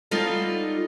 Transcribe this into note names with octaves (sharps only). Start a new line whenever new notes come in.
G3 B3 D#4 F4 A4